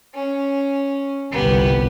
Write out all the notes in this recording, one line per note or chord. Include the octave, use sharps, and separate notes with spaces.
C#4
G1 C2 B3 G4